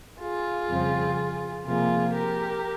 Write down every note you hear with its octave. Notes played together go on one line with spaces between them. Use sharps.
F4 G#4
F2 C#3 G3 C4
C3 F3 A#3 F4 G#4
G4 A#4